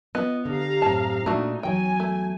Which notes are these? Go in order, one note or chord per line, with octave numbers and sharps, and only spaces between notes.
B3 F4 D#5
D3 G4 F5 A#5
F#2 A2 C4 A5
A#2 A3 D4 D#4 F#4
E2 F#3 G5 G#5
A3